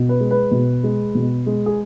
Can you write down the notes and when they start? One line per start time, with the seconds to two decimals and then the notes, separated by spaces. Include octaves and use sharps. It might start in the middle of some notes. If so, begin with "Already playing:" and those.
Already playing: B2
0.09 B4
0.20 G#3
0.31 B4
0.51 B2
0.83 G#3
1.15 B2
1.46 G#3
1.66 G#4